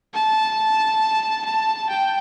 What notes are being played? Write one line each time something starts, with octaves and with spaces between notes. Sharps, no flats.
A5
A5
G5